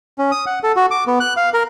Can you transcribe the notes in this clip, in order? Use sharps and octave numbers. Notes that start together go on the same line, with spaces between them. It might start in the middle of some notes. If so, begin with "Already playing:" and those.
C#4
D#6
F#5
A4
F#4
D6
B3
F#6
F5
A#4